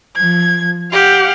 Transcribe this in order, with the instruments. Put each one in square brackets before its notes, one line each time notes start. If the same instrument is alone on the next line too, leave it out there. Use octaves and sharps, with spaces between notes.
[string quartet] F3 [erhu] G#6
[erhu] G4 [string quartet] F5 F#5